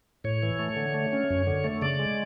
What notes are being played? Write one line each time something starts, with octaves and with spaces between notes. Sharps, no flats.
A2 C#5
E3
A3
D3
A3
C#4
F#2
D3
A3
C#3 D5
G#3